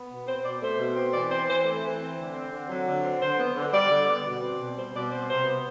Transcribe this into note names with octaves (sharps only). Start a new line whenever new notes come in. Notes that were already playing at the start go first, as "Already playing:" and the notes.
Already playing: B3
B2
C4 C5
B2 D5
A3 C5
B2
C4
E3 D5
C4 C5
E3 C5
A3
E3
C4
D3
C4
D3
F#3
D3
C4
D3 C5
B3
D3
G3 D5
D3
B3
B2
C4
B2
G3 C5
B2 D5
C4 C5
C3 C5
B3